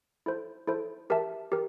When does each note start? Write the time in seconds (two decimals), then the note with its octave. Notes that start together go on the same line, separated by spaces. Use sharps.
0.26 E4 A4 C5
0.67 E4 A4 C5
1.10 G4 A#4 E5 A5
1.52 G4 A#4